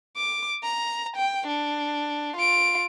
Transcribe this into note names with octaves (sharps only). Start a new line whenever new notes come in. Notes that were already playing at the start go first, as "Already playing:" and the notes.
D6
A#5
G5
D4
F4 D7